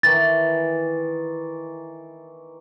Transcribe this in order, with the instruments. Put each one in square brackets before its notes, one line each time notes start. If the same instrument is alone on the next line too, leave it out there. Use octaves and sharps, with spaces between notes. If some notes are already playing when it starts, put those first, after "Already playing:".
[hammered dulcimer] D#3 E3 [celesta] A6